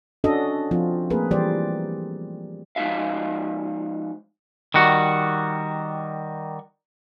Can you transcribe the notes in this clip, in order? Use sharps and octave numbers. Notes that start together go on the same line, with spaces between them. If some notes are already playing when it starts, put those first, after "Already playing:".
C#4 D4 F#4 A4 D#5
F3 C4 F4
A3 A#3 C4 G#4 A#4 B4
E3 G3 G4 C5 D5
F3 G#3 D#4 F#4 E5 F5
D#3 G3 F#4